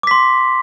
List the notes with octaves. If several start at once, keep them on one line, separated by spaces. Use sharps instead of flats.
C6 D6 B6